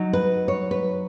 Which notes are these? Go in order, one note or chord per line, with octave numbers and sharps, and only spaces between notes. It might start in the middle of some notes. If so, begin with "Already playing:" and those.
Already playing: F#3 D#4
B4
C#5
B4